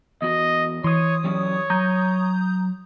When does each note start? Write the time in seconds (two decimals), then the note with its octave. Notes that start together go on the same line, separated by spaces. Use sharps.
0.22 E2 F#4 D#5
0.84 E3 C#5 C6 D#6
1.24 F#3 G3 C#4 C#5
1.70 F#3 A#5 D#6 G6